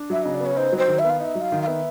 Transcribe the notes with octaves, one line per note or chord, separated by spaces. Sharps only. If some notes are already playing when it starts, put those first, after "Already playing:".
Already playing: D4
F#3 E5
C#3 D#5
D5
B3
C#5
D#4 C5
F#3
C5
D#3
E5
B3
F5
D#4 E5 F5
F#3
F5
D#3
F5
B3 E5